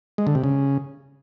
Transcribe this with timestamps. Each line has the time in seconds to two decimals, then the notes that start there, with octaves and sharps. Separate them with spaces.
0.18 G#3
0.27 D3
0.35 C3
0.44 C#3